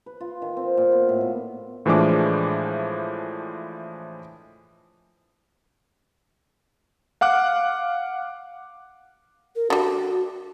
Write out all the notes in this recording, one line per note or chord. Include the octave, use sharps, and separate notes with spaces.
B4
F4
D#3
C4
A#2
B3
A2
B2
A2 E3 F3 G#3 D4 D6
F5 F#5 D6 F#6
A#4
D3 G3 F#4